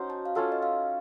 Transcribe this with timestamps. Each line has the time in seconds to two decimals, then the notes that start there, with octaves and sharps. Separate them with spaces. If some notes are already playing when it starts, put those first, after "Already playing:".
Already playing: C#4 D#4 F#4 C5
0.10 A5
0.25 F5
0.35 C#4 F4 A4 F#5
0.52 D#5
0.63 F5